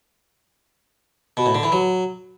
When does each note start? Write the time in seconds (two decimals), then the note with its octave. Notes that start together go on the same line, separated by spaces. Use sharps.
1.37 B2
1.46 A2
1.55 D3
1.63 E3
1.72 F#3